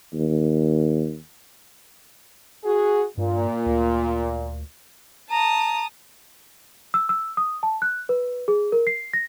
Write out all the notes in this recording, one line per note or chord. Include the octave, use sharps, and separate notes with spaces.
D#2
F#4 G#4
G2 A#2
D2
A5 A#5 D#6
E6
E6
D#6
A5
F#6
B4
G#4
A#4
C7
A#6